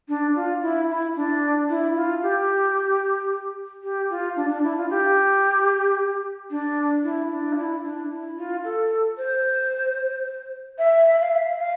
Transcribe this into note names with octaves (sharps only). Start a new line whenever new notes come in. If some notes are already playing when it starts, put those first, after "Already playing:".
D4
F4
E4
E4
D4
E4
F4
G4
G4
F4
D4
D4
E4
F4
G4
D4
E4
D4
F4
E4
D4
E4
F4
A4
C5
E5
F5
E5
F5